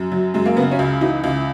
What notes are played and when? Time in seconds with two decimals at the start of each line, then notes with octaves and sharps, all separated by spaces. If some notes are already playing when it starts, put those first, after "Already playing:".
Already playing: F#2
0.12 F#3
0.34 F#2 G#3
0.45 A#3
0.56 C#3 B3
0.71 C#4
0.79 C#2
1.01 E3 D#4
1.24 C#2